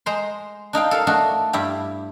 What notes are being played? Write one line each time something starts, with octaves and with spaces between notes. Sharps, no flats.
G#3 C5 A#5 C6
D4 D#4 F5 G5
A4 A#4 F5
A3 D4 D#4 F#4
G2 E4 G4